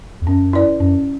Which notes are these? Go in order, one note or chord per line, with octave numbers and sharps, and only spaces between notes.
E2
F#2 C#4
E4 B4 D5
F#2 C#4